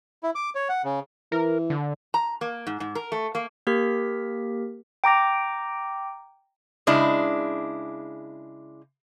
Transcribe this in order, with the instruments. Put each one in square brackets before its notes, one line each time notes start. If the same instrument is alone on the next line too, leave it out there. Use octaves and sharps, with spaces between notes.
[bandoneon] E4
D6
C#5
F#5
C#3
[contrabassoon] E3 [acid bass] A#4
[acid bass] D3
[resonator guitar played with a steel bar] A#5
A#3
G#2
G#2
A#4
A3
A#3
[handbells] A#3 G4 A#4 B6
G5 A#5 D6 A#6
[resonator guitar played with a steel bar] C#3 G#3 D4 E4